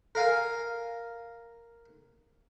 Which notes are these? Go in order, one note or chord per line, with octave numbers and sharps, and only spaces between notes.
A#4 F5 G#5